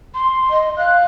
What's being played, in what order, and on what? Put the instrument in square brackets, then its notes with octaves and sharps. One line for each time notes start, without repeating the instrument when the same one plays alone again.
[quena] C6
[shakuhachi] D#5
[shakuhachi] F5 [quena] F#6